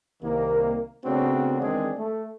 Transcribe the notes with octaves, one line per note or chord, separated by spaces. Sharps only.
C2 D#3 A#3
C#3 A3 B3 C4 D4 F#4
E2 D#3 G#3 C4 D4 G#4
A3